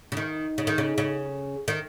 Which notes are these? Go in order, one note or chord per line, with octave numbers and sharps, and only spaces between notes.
C#3
D#3 D#4
C#3
D#3
C#3
C#3
D#3